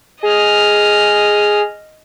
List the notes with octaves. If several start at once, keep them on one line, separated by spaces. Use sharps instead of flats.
G#4 D#5 F6